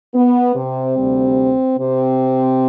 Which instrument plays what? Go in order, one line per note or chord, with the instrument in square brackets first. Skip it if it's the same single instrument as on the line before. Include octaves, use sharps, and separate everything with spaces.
[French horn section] B3
C3 C4
D2 C3 G3
C3 C4